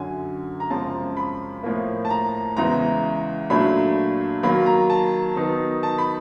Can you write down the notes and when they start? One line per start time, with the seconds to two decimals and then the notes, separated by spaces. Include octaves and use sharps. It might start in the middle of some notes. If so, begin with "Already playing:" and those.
Already playing: F#2 D3 F#3 G#5
0.60 A#5
0.70 F#2 C#3 F3 G#3 C4 A5
1.17 B5
1.63 A2 F3 A#3
2.05 A5
2.10 A#5
2.56 E2 C#3 E3 G#3 A#5
3.50 A#2 F#3 A3 D4 B5
4.43 D#3 F#3 A#3 B5
4.66 A#5
4.90 A5
5.36 D#3 F#3 B3 D#4
5.83 A5
5.98 B5